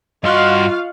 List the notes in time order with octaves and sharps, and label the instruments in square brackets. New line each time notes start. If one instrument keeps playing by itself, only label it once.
[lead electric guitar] G2 C6 [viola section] F4 F5 [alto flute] F#4 [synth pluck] D#5 C#6 F#6